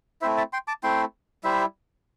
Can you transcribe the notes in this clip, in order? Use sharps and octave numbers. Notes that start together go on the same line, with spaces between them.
A3 C4 E4 C5 E5
E5 A5
G5 C6
A5 D6
A3 C4 E4 G5 C6
G3 E4 C5 E5